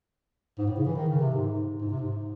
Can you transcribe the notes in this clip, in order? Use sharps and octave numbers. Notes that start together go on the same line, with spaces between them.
G#2
A2
C#3
E3
D#3
C#3
C3
G#2
G#2
C3
G#2